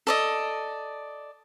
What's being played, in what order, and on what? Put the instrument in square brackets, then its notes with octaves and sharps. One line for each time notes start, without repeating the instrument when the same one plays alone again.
[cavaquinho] A4 D5 D#5